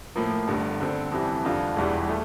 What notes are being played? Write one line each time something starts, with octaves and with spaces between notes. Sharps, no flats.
A2 F3 A#3
G1 G2 D3 G3
D3 G3 C4 G4
F2 C3 E3 G3
F2 D3 G3 D4 F4
E1 E2 E3 G3
A3